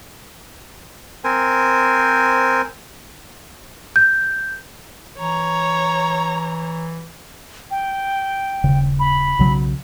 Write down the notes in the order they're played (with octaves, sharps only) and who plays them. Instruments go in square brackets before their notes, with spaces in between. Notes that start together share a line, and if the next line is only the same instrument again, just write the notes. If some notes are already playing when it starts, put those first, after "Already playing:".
[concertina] C4 A#4 C5 G#5
[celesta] G6
[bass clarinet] E3 [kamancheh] C#5 A#5
[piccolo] G5
[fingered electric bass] D#1 C#3
[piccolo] B5
[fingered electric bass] B1 C#3 F#3